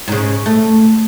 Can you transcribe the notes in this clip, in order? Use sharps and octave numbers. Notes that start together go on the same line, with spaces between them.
G#2 C#3
A3